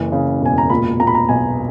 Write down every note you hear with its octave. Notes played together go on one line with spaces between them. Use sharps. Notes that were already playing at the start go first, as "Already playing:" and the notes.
Already playing: F#1 C#3 E3
C#3
E1 G#5
A#5
A#2 B5
A#2 A#5
B5
A#5
B1 G#5